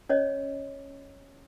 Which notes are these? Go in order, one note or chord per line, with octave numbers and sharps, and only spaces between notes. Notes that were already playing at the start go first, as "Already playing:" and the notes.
C#4 C#5 D#5